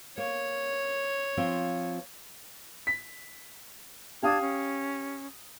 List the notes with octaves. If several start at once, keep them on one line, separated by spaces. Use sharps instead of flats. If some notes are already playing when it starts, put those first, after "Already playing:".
A#3 C#5
F3 C4 F4
B6
D4 G4 F5 A5 D#6 G#6
C#4